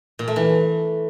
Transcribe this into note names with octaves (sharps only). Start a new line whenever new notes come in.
A#2
A3
E3